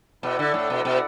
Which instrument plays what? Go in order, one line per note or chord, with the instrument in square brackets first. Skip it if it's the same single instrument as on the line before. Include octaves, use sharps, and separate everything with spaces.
[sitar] B2 [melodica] E4 A4 D5 F#5
[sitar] D3
A2
B2
B2